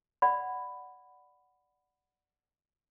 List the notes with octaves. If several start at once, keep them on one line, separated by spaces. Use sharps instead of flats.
D5 F#5 B5